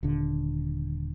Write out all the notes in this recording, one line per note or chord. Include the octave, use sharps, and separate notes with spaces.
D#1 D3